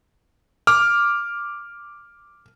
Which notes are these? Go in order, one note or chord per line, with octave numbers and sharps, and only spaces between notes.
D6 F6